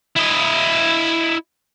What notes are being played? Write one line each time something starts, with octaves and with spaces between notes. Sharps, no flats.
E4 D#5